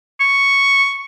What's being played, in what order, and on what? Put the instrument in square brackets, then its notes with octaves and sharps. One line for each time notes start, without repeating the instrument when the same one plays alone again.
[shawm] C#6